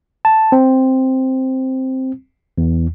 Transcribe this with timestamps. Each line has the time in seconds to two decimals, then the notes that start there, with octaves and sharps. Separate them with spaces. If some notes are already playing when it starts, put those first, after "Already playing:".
0.25 A5
0.52 C4
2.58 E2